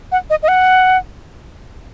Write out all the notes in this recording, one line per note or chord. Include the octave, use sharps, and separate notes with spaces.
F#5
D#5
D#5
F#5